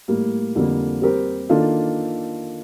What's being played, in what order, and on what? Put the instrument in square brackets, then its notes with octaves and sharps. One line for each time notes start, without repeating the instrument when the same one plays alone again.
[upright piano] A2 G3 A#3
F2 D3 G3 A#3
G3 C4 G4 A#4
D#3 A#3 D4 F4 A4